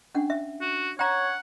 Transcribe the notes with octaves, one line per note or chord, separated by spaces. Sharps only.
C#4 D4 F#5
E5
F#4
C#5 F#5 G5 A#5